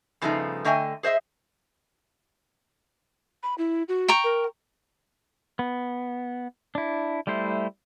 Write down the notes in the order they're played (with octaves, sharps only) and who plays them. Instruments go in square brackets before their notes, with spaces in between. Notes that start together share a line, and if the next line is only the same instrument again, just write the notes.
[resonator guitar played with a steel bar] G2 C#3 F3 A3 B3 D#4
D3 A3 D#5 G5 G#5
G#4 C5 D#5 E5
[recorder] B5
E4
F#4
[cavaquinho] G5 A#5 C#6
[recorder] A#4
[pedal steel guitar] B3
D4 E4
G3 A3 E4 C5